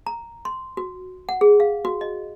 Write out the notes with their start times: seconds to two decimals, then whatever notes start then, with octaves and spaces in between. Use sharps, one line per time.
0.07 A#5
0.45 C6
0.77 F#4
1.29 F#5
1.41 G#4
1.60 F5
1.85 F#4
2.01 D#5